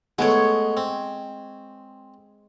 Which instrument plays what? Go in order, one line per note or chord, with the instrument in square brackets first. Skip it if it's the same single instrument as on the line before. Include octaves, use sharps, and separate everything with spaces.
[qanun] G#3 C#5 [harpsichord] A3 B3
[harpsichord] C4